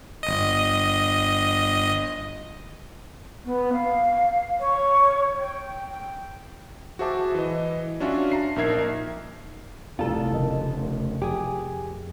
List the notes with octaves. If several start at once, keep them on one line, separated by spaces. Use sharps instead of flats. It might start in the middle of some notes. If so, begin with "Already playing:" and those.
G1 D#5
B3
F5
C#5
G5
G5
F#4 G#4 C5 E5 A5 D6
E3 D#5
C#4 D4 F4 F#4 E5
A5 A#5 C7
A#1 D#4 A#4 E5 G#6 C7
F1 C2 F4 A4
C#3 F3 A#4 D#5
F2 G4 G#4